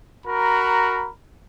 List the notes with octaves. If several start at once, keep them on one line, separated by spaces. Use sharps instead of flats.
F#4 A#4 A#5 B5